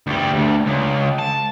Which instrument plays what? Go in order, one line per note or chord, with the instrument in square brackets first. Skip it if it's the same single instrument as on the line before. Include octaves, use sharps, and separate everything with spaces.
[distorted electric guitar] D2 G3
D2
C#2
A5